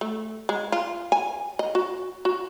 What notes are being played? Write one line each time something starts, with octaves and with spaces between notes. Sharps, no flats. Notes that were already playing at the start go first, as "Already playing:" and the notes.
A3
G#3
F4
G#5
D#5
F#4
F#4